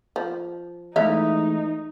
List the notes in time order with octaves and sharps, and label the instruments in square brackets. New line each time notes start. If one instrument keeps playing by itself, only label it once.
[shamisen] F3
[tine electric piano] E3 G#3 A3 [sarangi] D#4 [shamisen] E5 F5